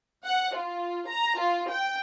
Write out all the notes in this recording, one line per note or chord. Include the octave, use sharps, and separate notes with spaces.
F#5
F4
A#5
F4
G5